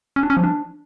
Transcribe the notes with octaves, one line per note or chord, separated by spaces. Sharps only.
C#4
D4
C#4
F3
D4